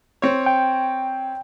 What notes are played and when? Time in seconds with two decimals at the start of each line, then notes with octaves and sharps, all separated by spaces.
0.22 C4 C#5
0.46 G5